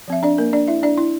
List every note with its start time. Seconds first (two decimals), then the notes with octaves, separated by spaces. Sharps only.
0.08 F3 C4 E5
0.23 D4 D5
0.38 A#3 A#4
0.53 D4 D5
0.68 E4 E5
0.83 D4 D5
0.98 E4